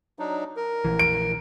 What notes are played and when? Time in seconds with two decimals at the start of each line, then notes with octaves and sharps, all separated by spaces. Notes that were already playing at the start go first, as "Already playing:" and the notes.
0.19 F#3 D4 D#4
0.56 A#4
0.85 A#1 E3
0.99 D7